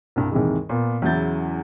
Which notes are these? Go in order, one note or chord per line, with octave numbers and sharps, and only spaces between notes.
C2 G2
D#2 G#2 C3 E3 G#3
A#2 B3
E2 C#3 F#3 E4 G6 A6